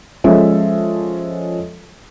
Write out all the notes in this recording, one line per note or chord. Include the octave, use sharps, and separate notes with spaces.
F3 G#3 C#4 A4 E5